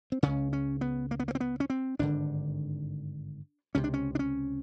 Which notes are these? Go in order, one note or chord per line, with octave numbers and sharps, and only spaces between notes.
C4
C#2 C#3 C#4
C#4
B3
A#3
B3
A#3
C4
B3
C#4
C4
G#1 G2 D3 D4
C#2 C3 C#4
D4
C#4
D4
C#4